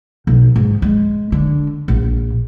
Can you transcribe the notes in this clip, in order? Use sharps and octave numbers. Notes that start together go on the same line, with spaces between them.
B1
G#2
G#3
D3
A#1